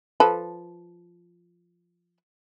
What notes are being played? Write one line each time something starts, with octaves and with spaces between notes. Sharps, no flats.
F3 A4 B4